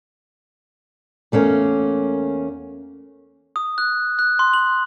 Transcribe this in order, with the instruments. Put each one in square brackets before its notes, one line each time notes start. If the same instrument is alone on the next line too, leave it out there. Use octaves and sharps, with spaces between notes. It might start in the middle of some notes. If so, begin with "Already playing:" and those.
[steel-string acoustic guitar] E2 A3 A#3 C#4
[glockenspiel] D#6
F#6
F#6
C6
F#7